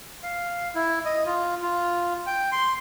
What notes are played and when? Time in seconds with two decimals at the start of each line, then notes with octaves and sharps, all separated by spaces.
0.23 F5
0.75 E4
1.05 D#5
1.26 F4
1.62 F4
2.27 G5
2.52 C6